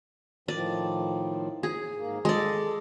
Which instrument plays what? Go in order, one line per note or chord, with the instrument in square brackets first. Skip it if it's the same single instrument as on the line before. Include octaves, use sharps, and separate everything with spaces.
[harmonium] A2 D#3 F3 [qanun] D5
[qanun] G#4
[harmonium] G#2 A#3
[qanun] G#3 D5 [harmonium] A4